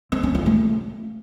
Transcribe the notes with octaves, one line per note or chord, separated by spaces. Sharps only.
C4
C#4
F4
A3